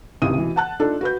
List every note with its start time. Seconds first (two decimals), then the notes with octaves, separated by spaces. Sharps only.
0.22 G#1 C#2 C3 E4 D#6 D#7
0.38 B2 E3
0.56 F#5 A5 F#6
0.80 D4 D#4 F4 A4
1.01 F#4 B4 G6